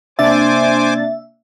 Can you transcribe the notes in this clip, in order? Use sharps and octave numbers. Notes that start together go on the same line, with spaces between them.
C3 A#3 D4 C5 E5 G#5 D6 A6